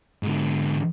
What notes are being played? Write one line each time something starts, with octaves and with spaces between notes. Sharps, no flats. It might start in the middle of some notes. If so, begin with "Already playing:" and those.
G#2 D3